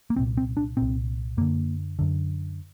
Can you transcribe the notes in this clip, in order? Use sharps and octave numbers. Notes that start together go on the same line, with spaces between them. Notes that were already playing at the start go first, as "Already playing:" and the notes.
A#3
C2 A#2 C4
C4
D4
C2 A#2 C4
F#2 D3 A#3
F#2 D3